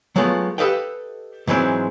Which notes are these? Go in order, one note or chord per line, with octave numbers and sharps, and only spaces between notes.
F#3 G#3 A3 B3 F4
G4 A4 B4 D#5 F5 G5
G#2 E3 F#3 G#3 C4